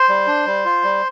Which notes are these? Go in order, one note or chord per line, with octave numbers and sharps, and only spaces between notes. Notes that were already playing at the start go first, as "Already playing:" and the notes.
Already playing: C5 C6
G3
D4
G3
F4
G3